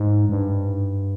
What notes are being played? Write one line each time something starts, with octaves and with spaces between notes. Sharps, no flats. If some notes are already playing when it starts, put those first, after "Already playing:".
Already playing: G#2
G2